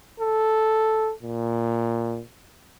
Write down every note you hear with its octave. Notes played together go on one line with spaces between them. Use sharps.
A4
A#2